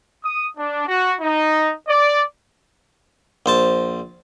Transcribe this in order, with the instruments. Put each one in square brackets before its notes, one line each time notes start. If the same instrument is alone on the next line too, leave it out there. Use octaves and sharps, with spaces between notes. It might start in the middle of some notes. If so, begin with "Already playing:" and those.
[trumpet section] D#6
D4
F#4
D#4
D5
[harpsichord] A#1 C5 A5